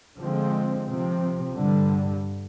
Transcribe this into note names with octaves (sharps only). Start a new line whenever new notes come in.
D3 F3 G#3 C4
C3 F3 C4
G2 D3 G3